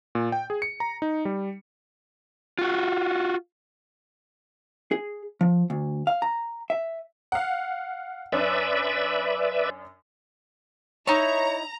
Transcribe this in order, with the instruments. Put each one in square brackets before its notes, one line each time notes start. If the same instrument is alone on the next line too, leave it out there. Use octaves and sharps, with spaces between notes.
[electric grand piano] A#2
G5
G#4
C#7
A#5
D#4
G3
[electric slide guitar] F4 F#4
[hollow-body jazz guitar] G#4
F3
D2
F5
A#5
E5
[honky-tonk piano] F5 F#5
[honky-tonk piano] F#2 C#4 D4 [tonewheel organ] B4 D5 E5
[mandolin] D#4 E4 [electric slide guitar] C#5 [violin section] A#5